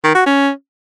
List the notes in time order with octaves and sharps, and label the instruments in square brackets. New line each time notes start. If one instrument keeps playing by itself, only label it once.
[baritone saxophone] D#3
F#4
C#4